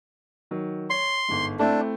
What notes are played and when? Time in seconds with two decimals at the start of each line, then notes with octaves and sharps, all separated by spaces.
0.51 D#3 F#3
0.90 C#5 C6
1.29 G1 G#2
1.59 A3 C4 D4 E4